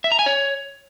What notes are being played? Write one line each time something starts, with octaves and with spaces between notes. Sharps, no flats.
E5
A#5
G#5
C#5